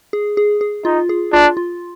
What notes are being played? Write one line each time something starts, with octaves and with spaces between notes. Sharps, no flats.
G#4
G#4
G#4
D#4 F4
G#4
D4 F4
F4